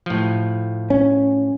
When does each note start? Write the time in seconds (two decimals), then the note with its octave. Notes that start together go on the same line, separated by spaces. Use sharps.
0.06 A2 F3
0.90 C#4